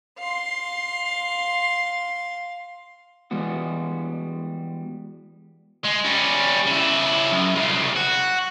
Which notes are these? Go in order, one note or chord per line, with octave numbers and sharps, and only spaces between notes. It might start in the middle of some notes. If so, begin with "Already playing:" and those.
F5 C6
E3 G3 G#3 B3 F#4
G#3
G3 C#4
C#3 E4
F#2
C2 C#3
F#4